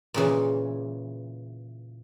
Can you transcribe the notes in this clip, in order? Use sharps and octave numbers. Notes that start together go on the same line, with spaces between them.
A#2 C#3 E3